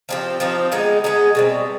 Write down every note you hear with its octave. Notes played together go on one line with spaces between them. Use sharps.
F3 C4 D#4 G4
F3 C4 D#4 G4
G#3 B3 D#4 G#4
G#3 B3 D#4 G#4
B2 G3 C4